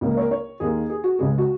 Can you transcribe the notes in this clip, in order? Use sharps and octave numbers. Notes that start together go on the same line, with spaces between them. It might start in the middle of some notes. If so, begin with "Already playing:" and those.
C#2 C#3 A#3
A#4
C#5
A#4
C#5
D#2 D#3 A#3 G#4
G#4
F#4
C#2 C#3 G#3 G#4
F#4